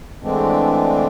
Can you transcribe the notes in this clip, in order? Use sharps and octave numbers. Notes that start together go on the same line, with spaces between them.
D3 E3 G#3 A3 C4 D4